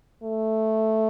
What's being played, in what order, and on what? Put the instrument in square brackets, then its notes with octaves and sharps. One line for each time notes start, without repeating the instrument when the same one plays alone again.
[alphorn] A3